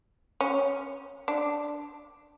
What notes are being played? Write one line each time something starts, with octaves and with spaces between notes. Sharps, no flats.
C#4
D4